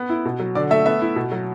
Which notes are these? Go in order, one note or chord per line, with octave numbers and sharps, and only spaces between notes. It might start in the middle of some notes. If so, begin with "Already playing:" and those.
Already playing: B3
E4
B2
F#3
D3 D5
A3 E5
B3 E5
E4
B2
F#3